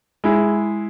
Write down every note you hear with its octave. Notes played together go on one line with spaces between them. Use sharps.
G#3 E4